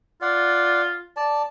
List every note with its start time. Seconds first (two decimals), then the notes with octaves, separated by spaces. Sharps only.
0.22 F4 D5 F#5
1.17 D5 A5